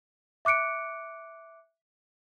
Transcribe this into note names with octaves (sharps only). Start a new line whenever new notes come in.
E5 D6 F#6 C#7 D7